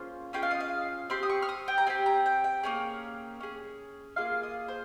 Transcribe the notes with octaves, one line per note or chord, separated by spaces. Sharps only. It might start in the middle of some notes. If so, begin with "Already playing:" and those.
Already playing: A#3 C#4 F4 G#4 C5
C#4 F4 G#4 G5
F5
D#5
F5
C4 G4 C6
D#6
C#6
F6
D#6
G5
A#5
C4 G4 G#5
A#5
G5
G5
A#3 C#4 G#4
C#4 G#4
A#3 F4 G#4 F5
D#5
C5